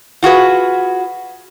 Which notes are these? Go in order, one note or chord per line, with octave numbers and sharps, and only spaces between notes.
F4 F#4 G#4 B4